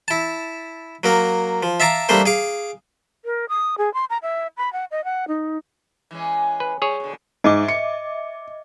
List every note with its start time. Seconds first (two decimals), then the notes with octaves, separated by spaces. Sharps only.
0.08 E4 A5
1.04 F#3 A#3 A#4
1.63 F3
1.80 E5 F5 A5 A#5 D6
2.09 G3 A3 A#3 D4 C5
2.26 G#4 F5 D6
3.25 A#4
3.49 D#6
3.78 G#4
3.94 C6
4.10 A#5
4.23 E5
4.57 B5
4.73 F#5
4.91 D#5
5.04 F#5
5.28 D#4
6.11 E3 G#3 C#4
6.60 B4
6.82 G3 G#4 C#5
7.00 B2 D3
7.44 G#2 D#5 E5 D6
7.68 C#7